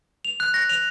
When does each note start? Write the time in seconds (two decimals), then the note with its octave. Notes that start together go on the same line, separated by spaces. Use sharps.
0.25 F7
0.40 F#6
0.54 A#6
0.69 F7